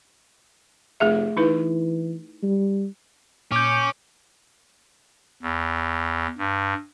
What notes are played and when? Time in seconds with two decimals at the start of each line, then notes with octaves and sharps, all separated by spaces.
1.00 F1 A3 G#4 E5
1.37 E3 D#4 E4 B4
2.43 G3
3.52 A#2 C#4 D6 G6
5.43 E2
6.38 G2